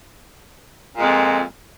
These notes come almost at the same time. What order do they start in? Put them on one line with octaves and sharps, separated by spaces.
A#2 G#3 F2